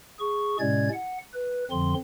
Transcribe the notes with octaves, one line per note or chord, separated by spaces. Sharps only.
G#4 C#6
A2 C3 G#3 C#4 D5 G#6
F#5
B4
F2 D3 F3 C4 C6